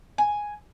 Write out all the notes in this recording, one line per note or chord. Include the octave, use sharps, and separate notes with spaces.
G#5